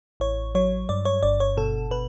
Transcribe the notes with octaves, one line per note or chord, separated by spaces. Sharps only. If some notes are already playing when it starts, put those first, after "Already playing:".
A1 C#5
F#3 C#5
G2 D5
C#5
G1 D5
C#5
B2 A4
B2 B4